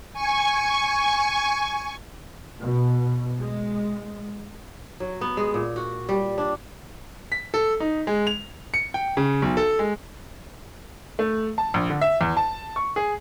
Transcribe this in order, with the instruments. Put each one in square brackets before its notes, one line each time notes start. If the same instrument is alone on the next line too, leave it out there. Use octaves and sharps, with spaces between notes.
[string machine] G#5 C#6
[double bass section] B2
G#3
[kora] F#3
B3
G#3
A#2
F#4
G3
D4
[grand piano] B6
A4
D#4
G#3
F7
C#7
G5
C#3
B1
A4
G#3
[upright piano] A3
A5
A#1
D3
E5
E2
A5
C#6
G#4